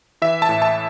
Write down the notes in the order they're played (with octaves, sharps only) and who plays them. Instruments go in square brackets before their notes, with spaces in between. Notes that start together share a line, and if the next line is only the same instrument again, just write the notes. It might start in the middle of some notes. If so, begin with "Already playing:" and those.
[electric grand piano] E3 E5
A5
A2
A5